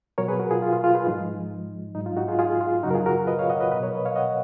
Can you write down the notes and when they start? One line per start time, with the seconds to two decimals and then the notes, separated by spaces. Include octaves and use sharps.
0.18 B2 F#3 A#4 C#5
0.28 G#4 B4
0.40 F#4 A#4
0.51 F4 G#4
0.62 F4
0.73 F4
0.84 F4 G#4
0.95 G#4 B4
1.07 G#2 F3 G#3 D#4
1.95 G#2 F#3 D#4
2.06 F4
2.17 D#4 F#4
2.28 F4 G#4
2.39 F4 G#4
2.61 F4
2.83 F#2 C#3 F#3 D#4 F#4
2.91 A#4
2.94 F4 G#4
3.06 F#4 A#4
3.27 B4 D#5
3.39 C#5 F5
3.50 D#5 F#5
3.60 B4 D#5
3.72 B2 F#3 B4 D#5
3.83 A#4 C#5
3.94 B4 D#5
4.05 C#5 F5
4.16 D#5 F#5